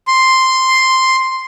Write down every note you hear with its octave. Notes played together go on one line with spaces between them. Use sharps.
C6